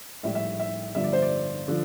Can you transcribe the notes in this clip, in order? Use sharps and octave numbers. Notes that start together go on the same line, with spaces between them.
A#1 A2 G3 E5
E5
E5
G1 G2 D3 F3 E5
D5
C5
D5
D3 F3